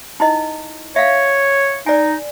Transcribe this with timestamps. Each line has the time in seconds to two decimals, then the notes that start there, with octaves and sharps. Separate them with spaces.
0.20 D#4 E4 D#5
0.96 C#5 E5 F5
1.86 D#4 D5 G#5